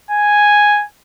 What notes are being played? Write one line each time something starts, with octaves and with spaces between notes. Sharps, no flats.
G#5